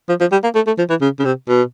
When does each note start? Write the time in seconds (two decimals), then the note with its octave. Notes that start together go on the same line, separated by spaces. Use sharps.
0.09 F3
0.20 F3
0.32 G3
0.43 A#3
0.55 A3
0.67 A3
0.78 F3
0.90 E3
1.01 C#3
1.19 C#3
1.25 C3
1.48 B2